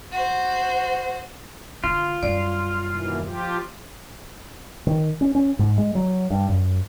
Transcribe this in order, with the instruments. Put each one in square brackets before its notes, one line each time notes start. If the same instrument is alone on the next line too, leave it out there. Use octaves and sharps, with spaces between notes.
[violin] F#4 C5
[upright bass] D3 [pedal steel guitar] F4
[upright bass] F#2 G3 [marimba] D5
[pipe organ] D#2 B2 E3
F3 F4 G4
[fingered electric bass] D#3
C#4
C#4
G#2
G#3
F#3
G2
F#2